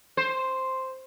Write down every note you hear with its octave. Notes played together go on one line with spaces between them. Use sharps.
C5